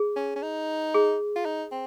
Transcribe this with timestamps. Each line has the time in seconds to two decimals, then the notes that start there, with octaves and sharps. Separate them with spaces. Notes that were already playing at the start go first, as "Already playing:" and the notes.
Already playing: G#4
0.16 C#4
0.36 C#4
0.42 D#4
0.94 G#4
1.36 F4
1.45 D#4
1.72 C4